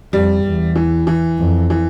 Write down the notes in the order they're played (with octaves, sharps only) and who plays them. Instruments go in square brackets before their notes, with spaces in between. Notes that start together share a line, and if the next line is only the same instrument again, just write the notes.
[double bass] F2 [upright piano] G3
[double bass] E2
[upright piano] E3
E3
[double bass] F2
[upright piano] E3